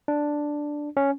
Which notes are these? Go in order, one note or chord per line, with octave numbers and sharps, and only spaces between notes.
D4
C#4